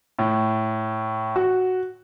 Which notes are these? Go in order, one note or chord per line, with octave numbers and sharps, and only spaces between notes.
A2
F#4